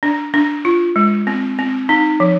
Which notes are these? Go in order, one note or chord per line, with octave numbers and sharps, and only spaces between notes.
D4
D4
F4
G#3
C4
C4
D#4
F3